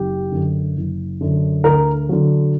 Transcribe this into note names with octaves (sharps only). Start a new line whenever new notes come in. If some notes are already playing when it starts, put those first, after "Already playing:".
Already playing: F#1 G4
F#2 D3
F#1
F#2 D3
D2 A#4
D3 F#3